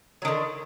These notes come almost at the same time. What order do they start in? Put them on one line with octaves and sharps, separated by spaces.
F#3 D#3 D3